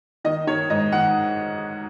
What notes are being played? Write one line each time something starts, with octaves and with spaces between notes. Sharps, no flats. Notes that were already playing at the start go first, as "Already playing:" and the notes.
D#3 D#5
D#3 C#5
G#2 D#5
D#3 F#5